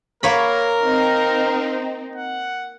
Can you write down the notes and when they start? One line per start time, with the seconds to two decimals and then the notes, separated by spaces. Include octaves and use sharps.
0.23 A#3 A#4 C#5 B5
0.82 C4 D#4
2.16 F#5